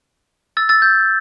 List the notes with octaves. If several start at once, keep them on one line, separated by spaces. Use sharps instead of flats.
E6 A6
E6 A6
G6